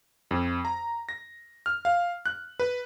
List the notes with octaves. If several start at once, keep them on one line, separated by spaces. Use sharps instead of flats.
F2
A#5
A#6
F6
F5
F#6
B4